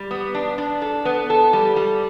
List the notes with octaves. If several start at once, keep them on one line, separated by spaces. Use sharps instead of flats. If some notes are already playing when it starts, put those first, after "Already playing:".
Already playing: G3
B3
D4
D4
A4
B3
A4
G3
G3